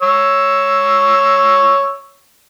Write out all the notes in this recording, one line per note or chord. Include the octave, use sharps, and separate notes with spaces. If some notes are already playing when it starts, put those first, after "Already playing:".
C#5 E6